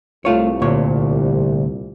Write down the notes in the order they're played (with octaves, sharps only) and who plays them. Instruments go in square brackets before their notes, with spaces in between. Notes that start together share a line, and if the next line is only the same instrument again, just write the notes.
[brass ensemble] C2 [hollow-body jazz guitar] A3 F4 C#5
[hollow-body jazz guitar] D2 A#2 C#5